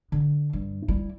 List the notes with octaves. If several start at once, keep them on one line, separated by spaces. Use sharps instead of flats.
D3
G2
G3 E4